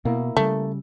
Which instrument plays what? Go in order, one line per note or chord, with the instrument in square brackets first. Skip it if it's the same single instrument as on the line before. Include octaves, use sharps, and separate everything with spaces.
[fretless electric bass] B2 [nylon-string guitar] A#3 E4
[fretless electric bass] C#3 G3 [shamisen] A3